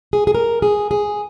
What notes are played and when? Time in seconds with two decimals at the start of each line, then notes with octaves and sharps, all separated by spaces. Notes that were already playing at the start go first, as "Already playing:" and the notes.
0.13 G#4
0.27 G#4
0.35 A#4
0.62 G#4
0.91 G#4